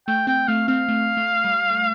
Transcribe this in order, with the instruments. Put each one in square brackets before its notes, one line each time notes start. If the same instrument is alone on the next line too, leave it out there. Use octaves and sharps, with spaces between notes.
[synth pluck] A3 [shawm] G5
[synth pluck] C4 [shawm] G5
[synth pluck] A3 [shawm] F5
[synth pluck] C4 [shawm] F5
[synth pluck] A3
A3
G3
A3